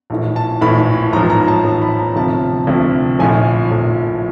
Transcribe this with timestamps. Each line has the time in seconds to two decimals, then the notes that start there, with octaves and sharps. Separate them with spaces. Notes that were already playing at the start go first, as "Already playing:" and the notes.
0.10 A#1 A2 E3
0.36 A5
0.61 A#1 A2 E3 B5
1.13 A1 G#2 F3 A#5
1.30 A#5
1.48 A5
1.65 A1 G#2 F3
1.82 B5
1.99 A#5
2.16 D2 C3 F3 A5
2.67 D2 C3 F3
3.19 A#1 A2 F3 G#5
3.71 A#1 A2 F3